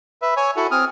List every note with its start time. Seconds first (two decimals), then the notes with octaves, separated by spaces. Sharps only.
0.22 B4 E5
0.37 C#5 G#5
0.56 E4 F#4 A4 F#5
0.71 C4 G#5 D#6 F6